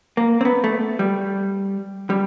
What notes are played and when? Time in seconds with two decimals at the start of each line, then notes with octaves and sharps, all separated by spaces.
0.17 A#3
0.41 C4
0.45 B3
0.64 A3
0.99 G3
2.10 G3